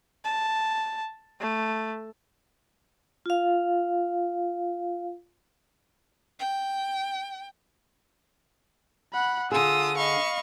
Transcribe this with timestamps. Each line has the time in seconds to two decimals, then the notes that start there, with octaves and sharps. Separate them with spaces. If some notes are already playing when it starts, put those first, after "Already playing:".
0.25 A5
1.40 A3
3.26 F4 F5
6.40 G5
9.13 F#5 B5
9.52 D3 F4 G#4 D#6 E6
9.97 D#5 F5 B5 C#6